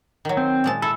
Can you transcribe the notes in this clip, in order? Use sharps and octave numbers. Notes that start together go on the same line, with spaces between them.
D#3 F#3
C4
A#2 G#3 A5
E4 A4